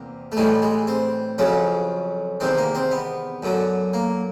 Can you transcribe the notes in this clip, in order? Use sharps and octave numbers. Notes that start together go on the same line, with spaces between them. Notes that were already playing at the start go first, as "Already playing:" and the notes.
Already playing: E2 C3 A#3
A3
A2 E3 G3 G#3
G#3
C4
F2 C#3 F#3 C#4
E2 C3 D#3 C4
A#3
C4
B3
F#2 D3 F#3
A#3